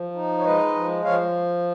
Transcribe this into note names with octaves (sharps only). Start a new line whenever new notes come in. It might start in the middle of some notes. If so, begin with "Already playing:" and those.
Already playing: F3
D#4
C#5
G#3 B4 D#5
F3
F3 C#5 F5